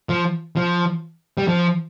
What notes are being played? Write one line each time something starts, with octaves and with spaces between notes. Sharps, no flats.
F3
F3
G3
F3